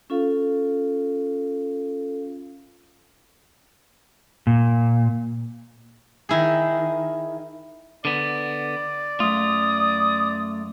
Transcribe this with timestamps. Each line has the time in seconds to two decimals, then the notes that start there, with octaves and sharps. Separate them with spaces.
0.10 C#4 F4 A4 F5
4.47 A#2
6.29 D#3 E4 G#4
8.05 D3 B3 D5
9.20 F#2 A3 F4 D#6